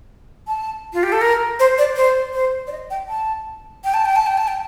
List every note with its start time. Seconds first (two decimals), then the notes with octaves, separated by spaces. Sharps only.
0.47 A5
0.93 F4
1.03 G4
1.12 A4
1.21 A#4
1.59 C5
1.78 D5
1.96 C5
2.34 C5
2.67 D5
2.71 D#5
2.90 G5
3.09 A5
3.84 G5
3.94 A5
4.05 G5
4.16 A5
4.26 G5
4.37 A5
4.48 G5